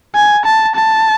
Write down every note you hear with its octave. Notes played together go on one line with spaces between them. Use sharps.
G#5
A5
A5